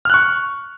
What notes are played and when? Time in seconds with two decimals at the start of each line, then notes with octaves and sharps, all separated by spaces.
0.05 F6
0.10 F#6
0.14 C#6